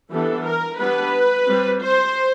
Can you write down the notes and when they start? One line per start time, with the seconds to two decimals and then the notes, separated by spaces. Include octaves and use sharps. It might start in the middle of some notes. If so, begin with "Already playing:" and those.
0.12 E3 G3 B3 D4 A4
0.46 A#4
0.80 G3 B3 D4 B4
1.47 G3 C4
1.81 C5